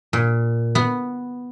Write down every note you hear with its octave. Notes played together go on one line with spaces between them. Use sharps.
A#2
B3